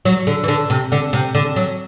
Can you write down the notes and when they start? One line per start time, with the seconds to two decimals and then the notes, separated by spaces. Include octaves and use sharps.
0.05 F#3
0.27 D3
0.44 E3
0.48 D3
0.70 C3
0.92 D3
1.13 C3
1.35 D3
1.56 F#3